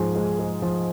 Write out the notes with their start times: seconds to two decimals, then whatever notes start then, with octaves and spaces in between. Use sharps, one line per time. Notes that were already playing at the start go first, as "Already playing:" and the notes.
Already playing: G#2 F3 G#4
0.16 G#3
0.39 G#3
0.62 F3